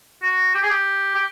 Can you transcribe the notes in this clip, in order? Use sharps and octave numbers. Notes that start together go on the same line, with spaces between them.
F#4
G4
G#4
G4
G4